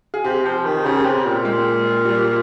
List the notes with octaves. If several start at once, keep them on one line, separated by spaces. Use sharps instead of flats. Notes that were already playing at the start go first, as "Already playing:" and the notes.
G#4
C3 G4
F3
D#3
C#3 G4
C3
A#2
G#3
G3